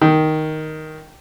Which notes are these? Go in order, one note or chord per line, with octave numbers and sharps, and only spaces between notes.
D#3